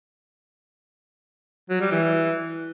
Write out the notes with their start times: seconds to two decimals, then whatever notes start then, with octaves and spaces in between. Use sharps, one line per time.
1.70 F#3
1.81 G3
1.91 E3